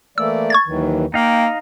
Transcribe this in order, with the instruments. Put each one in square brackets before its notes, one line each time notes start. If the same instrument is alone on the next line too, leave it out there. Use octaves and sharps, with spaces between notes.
[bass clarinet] E3 [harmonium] A3 A#3 D5 [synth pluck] E6
[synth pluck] C#6 G#6 A6
[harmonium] D#2 D#3 E3 [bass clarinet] F#3
[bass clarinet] A#3 [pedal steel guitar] D#4 F5 [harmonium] G5